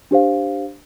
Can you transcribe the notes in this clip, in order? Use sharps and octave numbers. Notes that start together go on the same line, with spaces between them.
D4 G4 C5 F5